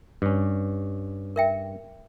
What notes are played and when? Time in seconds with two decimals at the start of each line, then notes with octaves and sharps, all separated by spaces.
0.22 G2 C#4
1.36 A#4 E5 G5